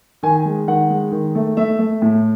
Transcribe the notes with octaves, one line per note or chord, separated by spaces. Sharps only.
D#3 G#5
G#3
D#3 F#5
G#3
D#3
A3
A3 E5
A3
A2